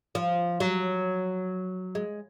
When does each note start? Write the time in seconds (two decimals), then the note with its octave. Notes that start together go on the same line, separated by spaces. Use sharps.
0.15 F3
0.60 F#3
1.95 G#3